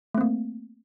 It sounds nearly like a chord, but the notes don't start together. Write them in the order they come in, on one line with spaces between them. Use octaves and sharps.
A3 C4 A#3